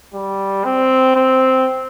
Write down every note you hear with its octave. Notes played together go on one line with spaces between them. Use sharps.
G3
C4
C4